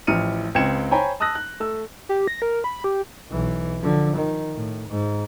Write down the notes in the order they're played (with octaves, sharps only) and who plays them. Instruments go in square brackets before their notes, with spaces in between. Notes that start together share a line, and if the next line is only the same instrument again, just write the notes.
[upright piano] A1 F3 E4 F6 C#7 D#7
C#2 C4 G5 G#6 C#7 E7
C5 C#5 G5 G#5 A#5 B5
A5 D#6 E6 F#6 A#6
F#6
A3 E6
[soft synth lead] G4
A#6
A#4
B5
G4
[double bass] B1 E3
D3 F3
D#3
A2
G#2